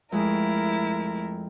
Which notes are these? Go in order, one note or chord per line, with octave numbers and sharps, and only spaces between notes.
F2 G#3 A3 E4 A#4